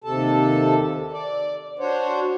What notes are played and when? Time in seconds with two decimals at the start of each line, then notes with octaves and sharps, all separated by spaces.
0.04 D#2 C3 A4 A5
1.12 D5
1.79 D4 F#4 C5 C#5